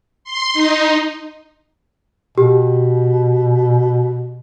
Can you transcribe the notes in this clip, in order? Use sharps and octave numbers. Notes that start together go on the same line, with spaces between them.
C6
D#4
B2 G4